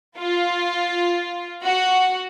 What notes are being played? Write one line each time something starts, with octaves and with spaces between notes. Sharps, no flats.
F4
F#4